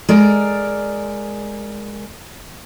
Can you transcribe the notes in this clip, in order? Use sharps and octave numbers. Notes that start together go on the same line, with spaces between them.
G#3 A#4 D5